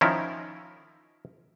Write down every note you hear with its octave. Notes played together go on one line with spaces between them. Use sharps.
D#3 F3 C#4 E4 A#4